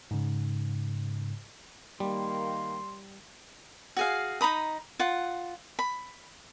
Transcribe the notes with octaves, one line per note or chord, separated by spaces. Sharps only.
G#2 C#3
D#3 G3 A#3 C6
F#4 G#4 F5
D#4 A#5 B5 D#6
F4 F#5
B5